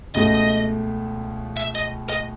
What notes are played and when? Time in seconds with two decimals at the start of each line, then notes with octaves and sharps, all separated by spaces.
0.15 C#2 B2 A3 D#5
1.57 E5
1.75 D#5
2.10 D#5